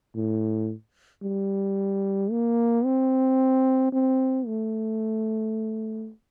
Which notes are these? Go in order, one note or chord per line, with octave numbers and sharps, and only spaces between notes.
A2
G3
A#3
C4
C4
A3